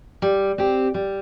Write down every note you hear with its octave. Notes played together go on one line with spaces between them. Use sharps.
G3
C4 G4
G3